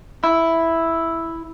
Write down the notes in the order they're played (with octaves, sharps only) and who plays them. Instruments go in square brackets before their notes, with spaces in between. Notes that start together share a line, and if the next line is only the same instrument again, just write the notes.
[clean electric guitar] E4